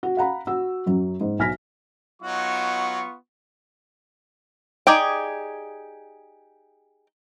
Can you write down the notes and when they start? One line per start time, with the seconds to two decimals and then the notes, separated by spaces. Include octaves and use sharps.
0.03 F#4
0.17 F5 F#5 A#5 B5
0.47 F#4 E6
0.86 F#2 F#3
1.21 G#2
1.39 B1 G#5 F6 A#6 B6
2.22 F#3 B3 D#4 F4 F#4 C#6
4.87 D#4 G4 G#4 D5 G5